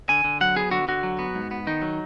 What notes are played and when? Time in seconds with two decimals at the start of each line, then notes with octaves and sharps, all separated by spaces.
0.09 D3 G#5
0.24 D3
0.41 F#3 F#5
0.56 B3 G#4
0.71 D3 F#4
0.88 D3 F#4
1.03 F#3
1.19 B3
1.35 G#2
1.51 B3
1.67 D#3 D#4
1.82 F#3